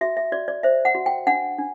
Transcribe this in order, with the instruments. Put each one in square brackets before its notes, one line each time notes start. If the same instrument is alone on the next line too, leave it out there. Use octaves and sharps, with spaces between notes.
[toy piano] F#4 E5
E5
F#4 D5
D5
C5 E5
F#5
F#4
G5
D4 F#5
D4